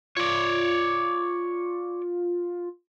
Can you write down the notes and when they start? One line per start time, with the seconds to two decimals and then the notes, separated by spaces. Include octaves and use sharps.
0.17 F4 C#5 D5